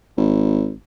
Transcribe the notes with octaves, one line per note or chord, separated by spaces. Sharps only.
G#1